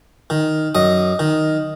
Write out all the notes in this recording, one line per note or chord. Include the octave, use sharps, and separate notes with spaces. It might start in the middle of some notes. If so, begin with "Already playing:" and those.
D#3
F#2 D#5
D#3